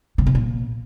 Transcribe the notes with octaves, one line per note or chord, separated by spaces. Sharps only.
C#3
C3
A#2